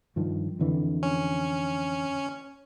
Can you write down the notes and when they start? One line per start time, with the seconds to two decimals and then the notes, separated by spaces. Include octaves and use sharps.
0.16 G2 D#3 F3
0.59 F2 D3 E3
1.03 C#4